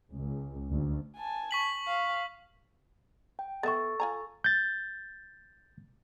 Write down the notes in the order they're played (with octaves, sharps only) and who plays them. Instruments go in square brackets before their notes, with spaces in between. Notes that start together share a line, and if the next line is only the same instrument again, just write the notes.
[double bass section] C#2
D2
[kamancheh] G#5 A5
[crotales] C#6 B6 F#7
[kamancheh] F5
[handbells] G5
[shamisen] B3 E5 [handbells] A4 [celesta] C#6 A6
[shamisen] F4 G#5 A#5
[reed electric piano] G6 A6